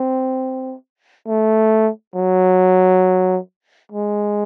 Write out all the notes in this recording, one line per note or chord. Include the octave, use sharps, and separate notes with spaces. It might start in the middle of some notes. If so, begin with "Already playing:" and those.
Already playing: C4
A3
F#3
G#3